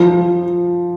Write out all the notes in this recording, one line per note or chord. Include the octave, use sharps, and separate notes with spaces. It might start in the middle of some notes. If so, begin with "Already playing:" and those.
Already playing: F3